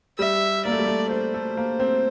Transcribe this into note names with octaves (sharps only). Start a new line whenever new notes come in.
G3 E5
A#3 D5
A3
G3
A3
A3 C5
A3
A#3
C4